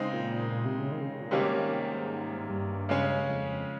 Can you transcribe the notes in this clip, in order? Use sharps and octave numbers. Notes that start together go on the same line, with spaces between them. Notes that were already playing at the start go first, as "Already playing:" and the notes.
Already playing: C#3 G#3 C4 D#4
A#2
A#2
C3
C#3
D#3
C#3
C#3
A#2
G#2 C3 D#3 G3 A#3 C#4
G2
C#3 G#3 C#4
F2